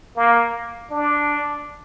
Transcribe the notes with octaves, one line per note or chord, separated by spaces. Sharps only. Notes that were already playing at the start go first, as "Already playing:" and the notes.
A#3
D4